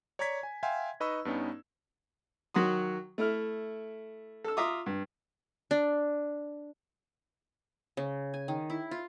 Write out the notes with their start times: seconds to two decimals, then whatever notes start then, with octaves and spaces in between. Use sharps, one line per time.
0.19 C#5 D5 A#5 C#6 G#6 B6
0.43 G#5
0.63 E5 F5 G5 G#5 C6
1.00 D#4 B4 D#5 B5 C#6 E6
1.25 G2 B3 C#4 D#4
2.54 D#3 F#3 F#4 C6 D#6
3.18 A3 E4 F6
4.44 A4 E6
4.57 F4 E5 A#5 D6 D#6
4.86 G2
5.71 D4
7.97 C#3
8.34 G#5
8.48 D#3
8.70 E4
8.91 F4